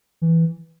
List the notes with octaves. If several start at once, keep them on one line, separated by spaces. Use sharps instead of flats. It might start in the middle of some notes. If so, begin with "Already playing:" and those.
E3